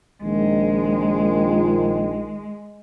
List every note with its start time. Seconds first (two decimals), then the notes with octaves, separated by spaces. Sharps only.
0.22 A#1 D#3 G#3